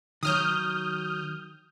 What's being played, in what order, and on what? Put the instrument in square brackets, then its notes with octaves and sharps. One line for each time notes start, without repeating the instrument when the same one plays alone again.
[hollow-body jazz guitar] D#3 F#3 [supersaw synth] D#6 F6 G6